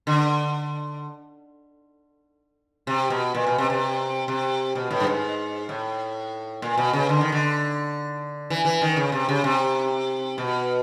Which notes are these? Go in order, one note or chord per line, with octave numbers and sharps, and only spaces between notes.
D3
C3
B2
A#2
B2
C3
C3
C3
B2
A2
G2
G#2
A2
A#2
B2
C#3
D3
D#3
D3
E3
E3
D#3
C#3
C3
C#3
C3
B2